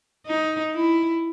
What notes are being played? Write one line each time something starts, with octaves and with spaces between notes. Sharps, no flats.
D#4
E4